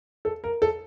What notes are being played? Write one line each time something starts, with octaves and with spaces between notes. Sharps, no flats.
A4
A#4
A4